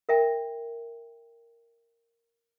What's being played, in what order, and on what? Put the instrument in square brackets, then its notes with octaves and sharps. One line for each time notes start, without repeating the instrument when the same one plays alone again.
[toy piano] A#4 E5 G5